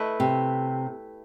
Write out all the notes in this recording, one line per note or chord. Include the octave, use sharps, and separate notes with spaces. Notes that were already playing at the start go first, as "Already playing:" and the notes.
Already playing: A3 E4 B4 D#5
C3